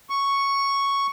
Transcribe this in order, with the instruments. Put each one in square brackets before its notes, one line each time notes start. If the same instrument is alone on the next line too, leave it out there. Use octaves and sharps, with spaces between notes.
[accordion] C#6